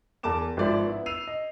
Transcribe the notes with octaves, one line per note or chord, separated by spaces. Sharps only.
E2 A#4 A5 D6 E7
G#1 F3 C5 D5 E5
B3 E4
E6 C7 D#7 F7
D#5